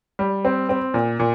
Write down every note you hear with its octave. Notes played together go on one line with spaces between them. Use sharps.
G3
C4
C4
A#2
A#2